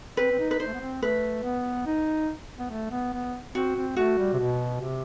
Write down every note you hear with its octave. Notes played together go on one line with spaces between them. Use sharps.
C4 B4
C4
D#4
B4
D#4 C5
A3
B3
C4
A3 B4
B3
D#4
B3
A3
B3
B3
C4 F#4
C4
A3 F#4
G3
C3
B2
C3